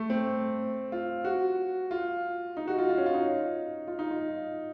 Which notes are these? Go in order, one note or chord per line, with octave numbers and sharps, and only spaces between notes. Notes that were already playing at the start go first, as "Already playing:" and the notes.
Already playing: A3
C4
F4
F#4
F4
D#4
F#4
F4
F4
C#4
F4
D#4
F4
D#4
F4